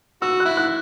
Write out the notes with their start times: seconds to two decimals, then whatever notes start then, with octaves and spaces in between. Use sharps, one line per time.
0.21 F#4 E6
0.40 F#6
0.45 E4
0.57 F#6